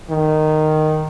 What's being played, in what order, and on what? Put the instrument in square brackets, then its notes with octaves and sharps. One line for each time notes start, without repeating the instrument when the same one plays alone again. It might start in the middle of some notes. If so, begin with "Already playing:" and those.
[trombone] D#3